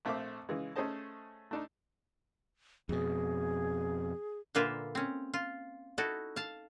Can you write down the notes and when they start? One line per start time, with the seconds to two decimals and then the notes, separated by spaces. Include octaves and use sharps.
0.05 A#1 A3 C4 E5 F5 D6
0.49 C#3 E3 G#3
0.76 A3 C#4 G#4 C5 D#5 A5
1.51 A3 D4 D#4
2.89 F2 B2 G#4
4.55 A#2 D3 A#3 F4 B4 E5
4.95 C4 C#4
5.34 F4
5.98 D#4 E4 F#4 A4
6.36 F5 A5